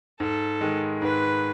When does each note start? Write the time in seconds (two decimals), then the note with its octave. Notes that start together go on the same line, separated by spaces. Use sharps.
0.20 G#2 A4
0.61 D#3 G#3
1.02 G#2 B4